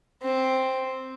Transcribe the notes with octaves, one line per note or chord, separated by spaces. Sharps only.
C4